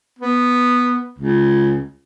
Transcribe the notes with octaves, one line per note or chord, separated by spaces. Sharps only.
B3
C#2